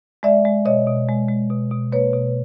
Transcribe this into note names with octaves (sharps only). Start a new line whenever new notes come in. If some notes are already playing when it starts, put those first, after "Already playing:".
G#3 D5 E5
G#3
B2 C#5 D#5
B2
G#3
G#3
B2
B2
A#3 B4 C#5
B2